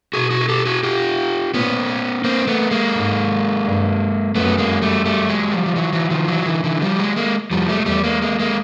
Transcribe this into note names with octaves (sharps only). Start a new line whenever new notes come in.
B2 F#4 G#4
F#4 G#4
G#4
G4 A4
F#4 G#4
F4 G4
A#2 B3 C#4
A#3 C4
A3 B3
G#3 A#3
G#2
G2
F#2 A3 B3
A3
G#3 A#3
G3 A3
G3 A3
F#3 G#3
F3 G3
F3
E3 F#3
E3 F#3
D#3 F3
E3 F#3
D3 E3
D3 E3
F3 G3
F#3 G#3
G#3 A#3
F2 F3 G3
G3 A3
G#3
E2 G3 A3
G#3 A#3
G#3 A#3
G#3 A#3